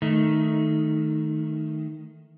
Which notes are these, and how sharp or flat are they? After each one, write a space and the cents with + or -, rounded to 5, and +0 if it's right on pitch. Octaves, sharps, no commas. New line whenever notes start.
D#3 +0 A3 +0